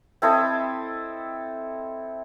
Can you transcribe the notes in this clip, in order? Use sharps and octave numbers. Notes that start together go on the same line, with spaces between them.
C4 E4 A4 D#5